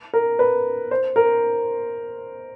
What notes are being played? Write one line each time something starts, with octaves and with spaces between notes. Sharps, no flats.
A#4
B4
C5
A#4